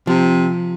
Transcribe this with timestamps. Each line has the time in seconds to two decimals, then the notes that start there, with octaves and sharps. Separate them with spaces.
0.07 C3 F3